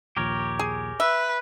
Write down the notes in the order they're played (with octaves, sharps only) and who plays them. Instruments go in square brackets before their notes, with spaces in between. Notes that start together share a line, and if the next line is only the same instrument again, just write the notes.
[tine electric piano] A#1 D#2 A#2 [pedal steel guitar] G4 A#4 C#5
[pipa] G#4
[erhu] B4 [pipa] E5